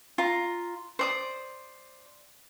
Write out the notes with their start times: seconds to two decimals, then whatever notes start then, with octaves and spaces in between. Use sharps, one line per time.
0.18 F4 A#5
0.99 C5 D5 D#6